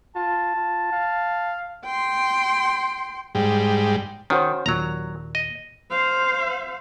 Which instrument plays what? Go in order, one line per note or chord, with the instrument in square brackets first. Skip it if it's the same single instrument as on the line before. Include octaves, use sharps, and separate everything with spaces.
[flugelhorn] F4 [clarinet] A5
[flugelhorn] F4
F5
[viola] G5 C6
[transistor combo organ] G#2 G3
[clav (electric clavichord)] D#3 [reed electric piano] C#4 F#4 C5
[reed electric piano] D#2 A#2 [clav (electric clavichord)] F#3 A#5
[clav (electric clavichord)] D#5
[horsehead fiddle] C5 F5